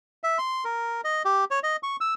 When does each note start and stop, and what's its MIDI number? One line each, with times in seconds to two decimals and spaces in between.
0.24 0.38 76
0.38 0.64 84
0.65 1.01 70
1.04 1.23 75
1.25 1.45 67
1.51 1.60 73
1.63 1.76 75
1.83 1.96 85
2.01 2.14 88